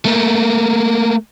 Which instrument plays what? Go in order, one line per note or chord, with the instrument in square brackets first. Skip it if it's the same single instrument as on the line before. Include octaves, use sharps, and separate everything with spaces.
[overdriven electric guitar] A3 A#3